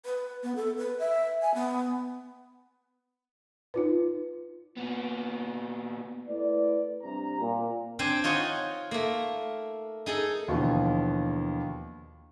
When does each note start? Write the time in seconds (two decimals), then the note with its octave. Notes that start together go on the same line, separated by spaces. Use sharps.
0.05 B4
0.43 B3
0.56 A4
0.77 B4
0.99 E5
1.42 G#5
1.54 B3
3.74 D#4 F4 B4
4.77 A#2 B3
6.28 A3 E4 B4 D5
7.03 G2 C3 A#5
7.39 A#2
7.99 C4 D4 C5 G5 G#5
8.24 D#4 F4 C#5 D#5 F#5 G#5
8.91 A3 A#3
10.06 D#4 G#4 A4
10.48 D#2 B2 D3 E3 F3